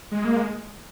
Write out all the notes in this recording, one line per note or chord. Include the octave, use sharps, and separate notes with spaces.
G#3
A#3
G#3